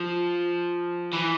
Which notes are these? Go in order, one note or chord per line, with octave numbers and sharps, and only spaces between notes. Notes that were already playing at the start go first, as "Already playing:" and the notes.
Already playing: F3
E3